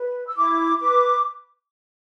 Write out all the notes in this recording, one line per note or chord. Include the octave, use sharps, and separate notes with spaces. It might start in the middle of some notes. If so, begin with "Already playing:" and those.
Already playing: B4
E6
E4 D6
B4 D6